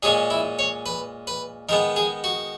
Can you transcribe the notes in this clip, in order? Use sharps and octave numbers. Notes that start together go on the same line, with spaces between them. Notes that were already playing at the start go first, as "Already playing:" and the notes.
A#2 G#3 C#4 G#4
E4
C#5
B4
B4
D#3 G#3 B3 A#4
G#4
F#4